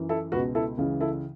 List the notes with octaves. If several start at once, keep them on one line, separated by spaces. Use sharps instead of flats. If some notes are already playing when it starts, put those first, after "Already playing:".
Already playing: F#2 E3
E4 A4
C#2 B2 F#4 B4
E4 A4
C#2 C#3 E3
E4 A4